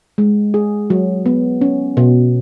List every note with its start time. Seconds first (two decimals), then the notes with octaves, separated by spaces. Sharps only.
0.18 G#3
0.54 G#4
0.90 F#3
1.26 B3
1.61 C#4
1.97 B2